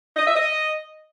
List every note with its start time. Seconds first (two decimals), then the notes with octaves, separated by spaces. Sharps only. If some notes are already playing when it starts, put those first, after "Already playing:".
0.17 D#5
0.26 E5
0.35 D#5